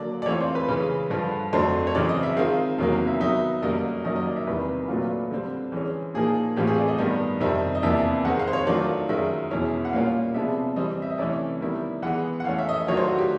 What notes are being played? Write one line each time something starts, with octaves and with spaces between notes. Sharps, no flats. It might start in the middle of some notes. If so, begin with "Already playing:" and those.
Already playing: D3 F#3 A#3 D5
D5
E3 A3 C4 F4 C#5
C5
B4
C#3 E3 G#3
G2 D3 F3
F2 D3 F#3 A3 D4 C5
C#5
F#2 C#3 E3 G#3 C4 D5
D#5
E5
D#3 G#3 C4 F4 F5
E2 C3 D#3 F#3 A#3 F5
F5
E5
D#3 F#3 B3 D#4 E5
F#2 D3 G3 A#3 D#5
F#2 D#3 F#3 A#3 D#5
D#5
D5
E5
E2 C3 D#3 G3 B4
A#2 F#3 A3 D4 F4
D3 G3 C4
E3 G#3 C#4
A#2 F3 A#3 D#4 G#4
A2 E3 A3 C4 F4 G4
G#4
D5
D#5
G2 D#3 G3 B3 D4
F2 C3 D#3 G3 C4 E5
D#5
E2 C3 F3 A#3 D4 E5
D#3 G#3 C4 F#5
F5
C5
C#5
D#3 F#3 A3 D4 F4 D5
F#2 D#3 G#3 E5
E2 B2 G#3 C#4 E4
F#5
A#2 G3 A#3 C#4 F4 F5
C3 F3 G#3 B3 D4 E5
E3 G3 C4 D#5
E5
D#5
C3 E3 A3 C#4 E4 D5
D#3 G3 B3 E4
E3 G#3 B3 F#5
F#5
E3 A3 C#4 F5
E5
D#5
E5
D#3 F#3 A3 D4 F4 C#5
C5
F#4
G4